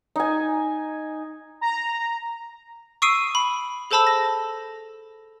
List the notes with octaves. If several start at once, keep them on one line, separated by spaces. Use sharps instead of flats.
D#4 G#5
A#5
C#6 D#6 E6 C7 D7 D#7
B5
G#4 A4 C5 A5 B5 E6
A#6